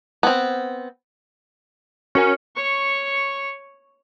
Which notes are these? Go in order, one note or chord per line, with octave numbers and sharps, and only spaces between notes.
B3 C4
C#4 F#4 A#4 G#5
C#5 C#6